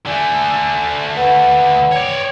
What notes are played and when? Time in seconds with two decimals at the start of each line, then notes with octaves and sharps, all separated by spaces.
0.06 D3 A3 D5 G#5
1.16 B4 F#5 B5
1.91 C#5 D5 G5